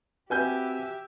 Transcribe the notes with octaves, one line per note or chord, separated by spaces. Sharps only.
C4 F#4 G4 B4 E5 G#5 G6